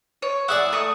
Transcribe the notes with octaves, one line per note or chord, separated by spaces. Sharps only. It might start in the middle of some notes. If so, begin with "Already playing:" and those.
C#5
E4 G#4 D5 F#5
A3 C#6 D#6